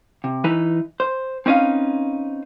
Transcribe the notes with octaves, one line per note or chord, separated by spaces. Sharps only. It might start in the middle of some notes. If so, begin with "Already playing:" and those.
C3
E3 D#4 B4
C5
C4 C#4 D#4 B4 F5